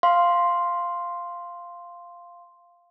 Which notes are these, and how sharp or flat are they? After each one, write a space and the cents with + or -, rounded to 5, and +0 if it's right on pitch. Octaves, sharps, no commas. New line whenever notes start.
F5 -5 C6 +0